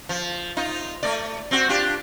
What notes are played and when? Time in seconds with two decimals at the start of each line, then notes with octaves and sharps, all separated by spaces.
0.09 F3
0.57 D#4 F4
1.03 A3 D5
1.51 C4 F#4
1.69 D4 F4 G4